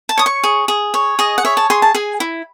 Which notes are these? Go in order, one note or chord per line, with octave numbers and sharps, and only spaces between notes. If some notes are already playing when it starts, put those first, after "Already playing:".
A5
C#5 D#6
C#6
G#4
G#4
C#5
G#4 D#5
F#5
C#5 E5
A5
G#4 C6
A5
G#4 G#5
E4